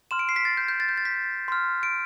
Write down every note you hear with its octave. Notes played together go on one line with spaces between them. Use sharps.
C6 F6 E7
D7
C7
B6
A6
G6
G6
A6
G6
A6
B6
C6 F6
D7